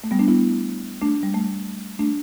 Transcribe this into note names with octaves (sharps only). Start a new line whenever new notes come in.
A3
G3 B3
A3 D4
B3 E4
A3 D4
G3
A3
A3 D4